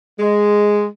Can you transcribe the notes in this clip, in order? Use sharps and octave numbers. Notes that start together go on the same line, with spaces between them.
G#3